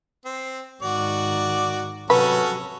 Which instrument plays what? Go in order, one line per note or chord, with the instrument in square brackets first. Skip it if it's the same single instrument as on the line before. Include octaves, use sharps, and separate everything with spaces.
[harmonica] C4
[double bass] G#2 D#3 [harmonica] F#4 D5
[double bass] C3 F#3 [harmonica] C#4 F#4 A4 [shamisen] B4